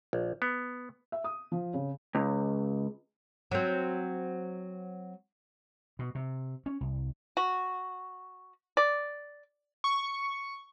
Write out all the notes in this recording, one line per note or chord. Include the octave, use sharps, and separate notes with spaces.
A#1
B3
E5
D#6
F3
C#3
C#2
F#3 C4
B2
C3
C#4
C2
F#4
D5
C#6